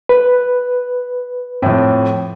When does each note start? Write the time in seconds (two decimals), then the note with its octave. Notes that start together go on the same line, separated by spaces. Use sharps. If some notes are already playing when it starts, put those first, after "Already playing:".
0.09 B4
1.62 F2 A2